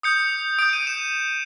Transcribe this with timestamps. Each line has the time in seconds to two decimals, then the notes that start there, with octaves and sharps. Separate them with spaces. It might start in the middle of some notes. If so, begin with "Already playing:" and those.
0.03 D#6 G6 C#7
0.59 D#6 G6 D7
0.73 D#7
0.87 E7